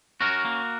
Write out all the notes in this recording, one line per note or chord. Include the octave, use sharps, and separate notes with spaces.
C#4 F#4 A#4
A#3